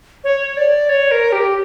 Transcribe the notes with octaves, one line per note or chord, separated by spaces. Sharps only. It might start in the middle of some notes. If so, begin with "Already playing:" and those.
C#5
D5
C#5
A#4
G4